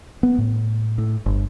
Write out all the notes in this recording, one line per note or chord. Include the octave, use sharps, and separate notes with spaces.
B3
A2
A2
G1